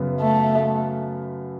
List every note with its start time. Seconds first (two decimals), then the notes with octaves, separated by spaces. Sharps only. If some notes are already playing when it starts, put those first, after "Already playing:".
Already playing: F#2 C#3 F#3 B3
0.21 A3